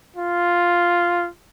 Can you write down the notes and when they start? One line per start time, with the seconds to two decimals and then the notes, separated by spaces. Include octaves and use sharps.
0.16 F4